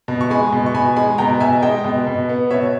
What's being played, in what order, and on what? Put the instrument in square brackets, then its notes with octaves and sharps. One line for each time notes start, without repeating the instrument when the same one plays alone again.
[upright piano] B2
C#6
G#3 G#5 B5
B2
C#6
B2 G#5 B5
G#3 G#5 B5
B2 G5 A#5
B2 E5 G#5
G#3 D#5 G5
B2
B2
B3
B2 C#5 E5